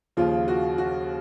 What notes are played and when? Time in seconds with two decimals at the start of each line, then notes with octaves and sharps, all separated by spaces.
0.17 D#2 C#3 F3 F4
0.48 F#4
0.78 F#4